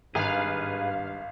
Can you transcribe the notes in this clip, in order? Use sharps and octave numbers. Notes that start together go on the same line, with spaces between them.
G#1 G2 G#4 B4 F5